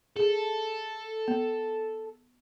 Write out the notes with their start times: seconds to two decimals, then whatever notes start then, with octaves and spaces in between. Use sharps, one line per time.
0.16 G#4 A4
1.28 B3